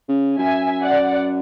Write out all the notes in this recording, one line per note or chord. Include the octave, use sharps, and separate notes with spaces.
C#3
F#2 E5 G#5
D5 F#5